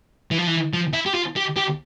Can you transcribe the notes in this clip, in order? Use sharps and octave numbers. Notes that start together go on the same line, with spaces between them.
E3
F3
E3
F3
E4
G4
F4
G4
G4